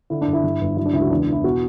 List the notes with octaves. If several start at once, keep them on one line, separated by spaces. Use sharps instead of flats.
D3 E4
D4
G1
E4
G2
G1
F#3 E4
D4
C#2 E4
F#4
E2 D4
E3 E4
B2 F#4